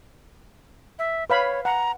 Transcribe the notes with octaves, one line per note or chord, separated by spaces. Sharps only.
E5
B4 C#5 F5 B5
F#5 A#5